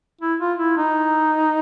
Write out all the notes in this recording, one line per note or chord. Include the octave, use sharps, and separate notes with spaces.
E4
F4
E4
D#4